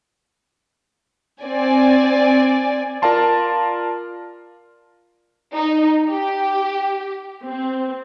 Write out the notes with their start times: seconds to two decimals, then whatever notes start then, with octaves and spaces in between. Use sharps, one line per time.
1.42 C4 D5 G#5
3.02 F4 A#4 D5 F5 A5 C6
5.55 D#4
6.09 G4
7.46 C4